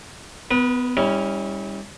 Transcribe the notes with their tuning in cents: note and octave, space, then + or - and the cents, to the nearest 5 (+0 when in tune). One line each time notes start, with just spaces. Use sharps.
B3 +20 B4 -30
G3 +25 C#4 +0 E4 -40